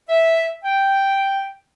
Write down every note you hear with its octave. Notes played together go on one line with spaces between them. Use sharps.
E5
G5